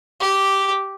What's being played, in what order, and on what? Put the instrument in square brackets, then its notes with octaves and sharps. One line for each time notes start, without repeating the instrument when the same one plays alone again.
[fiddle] G4